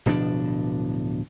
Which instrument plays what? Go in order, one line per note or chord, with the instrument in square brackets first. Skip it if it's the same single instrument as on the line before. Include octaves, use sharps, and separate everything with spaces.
[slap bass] D1 B2 F3 D4